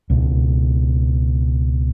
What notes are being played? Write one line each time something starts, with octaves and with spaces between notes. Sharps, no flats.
C#2 B2